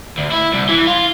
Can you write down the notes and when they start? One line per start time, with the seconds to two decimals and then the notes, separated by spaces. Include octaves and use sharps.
0.18 D2
0.31 E4
0.53 C2
0.69 E3
0.87 F4